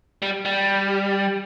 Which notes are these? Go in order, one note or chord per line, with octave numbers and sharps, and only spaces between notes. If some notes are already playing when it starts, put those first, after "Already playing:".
G3
G3